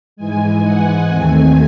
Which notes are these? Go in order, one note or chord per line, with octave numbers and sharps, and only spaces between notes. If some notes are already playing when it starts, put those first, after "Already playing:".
G#2 E3 G#3 G#5
F#5
D#2 D#3 A3 C4 G#5